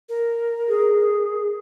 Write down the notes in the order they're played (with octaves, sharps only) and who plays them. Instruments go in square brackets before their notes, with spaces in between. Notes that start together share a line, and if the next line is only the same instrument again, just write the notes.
[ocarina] A#4
[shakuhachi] G#4